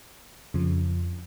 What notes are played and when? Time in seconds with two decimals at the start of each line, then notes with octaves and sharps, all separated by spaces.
0.54 F2 C#3 F3